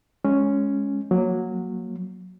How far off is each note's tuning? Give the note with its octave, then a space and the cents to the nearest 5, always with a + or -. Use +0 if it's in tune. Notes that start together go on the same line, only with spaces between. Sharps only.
G#3 +0 C#4 +0
F#3 -10 A#3 -5